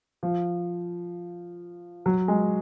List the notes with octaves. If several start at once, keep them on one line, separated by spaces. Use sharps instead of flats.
F3
F#3
G#3